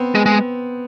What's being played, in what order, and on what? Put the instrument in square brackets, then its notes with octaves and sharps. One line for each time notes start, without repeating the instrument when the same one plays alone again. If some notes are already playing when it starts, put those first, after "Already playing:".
Already playing: [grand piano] B3 C4
[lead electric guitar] G#3
G#3